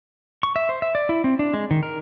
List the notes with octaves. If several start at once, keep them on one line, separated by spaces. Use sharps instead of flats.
C#6
E5
C5
E5
D5
E4
C4
D4
G#3
D#3
A#4